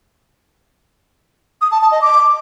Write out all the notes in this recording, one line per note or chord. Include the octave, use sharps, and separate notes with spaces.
D#6
A5
A5
D#5
D6